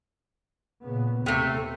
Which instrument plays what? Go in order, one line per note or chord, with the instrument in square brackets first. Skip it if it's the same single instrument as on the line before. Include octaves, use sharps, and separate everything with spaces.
[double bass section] A#2 C#3 B3
[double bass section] D#2 [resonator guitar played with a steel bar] C3 A3